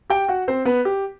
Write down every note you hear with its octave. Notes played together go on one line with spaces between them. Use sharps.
G4 G5
F#4 F#5
C4 C5
B3 B4
G4